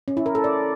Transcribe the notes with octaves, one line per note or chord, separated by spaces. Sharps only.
C#4
E4
A#4
A4
D5